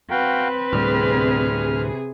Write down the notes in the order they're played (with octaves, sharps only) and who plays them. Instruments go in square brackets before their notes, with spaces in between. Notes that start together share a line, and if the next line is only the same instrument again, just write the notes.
[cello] C4 B4 [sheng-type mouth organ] F#4 F5 G5
[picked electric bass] D2 A2 G3 [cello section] C3 G#4 [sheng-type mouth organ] F6